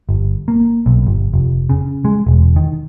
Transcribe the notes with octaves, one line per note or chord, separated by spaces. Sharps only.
G1
A#3
B1
G1
F1
C#3
G#3
E1
D#3